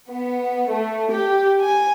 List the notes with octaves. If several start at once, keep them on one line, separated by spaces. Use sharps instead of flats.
B3
A3
G4
G#5